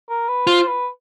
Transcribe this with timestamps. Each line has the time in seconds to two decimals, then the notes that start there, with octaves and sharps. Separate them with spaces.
0.09 A#4
0.28 B4
0.47 F4 C5
0.67 B4